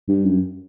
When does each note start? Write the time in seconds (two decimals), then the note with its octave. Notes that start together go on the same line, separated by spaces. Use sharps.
0.08 G2
0.26 F#2